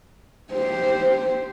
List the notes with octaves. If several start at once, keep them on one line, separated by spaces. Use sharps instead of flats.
G4 C5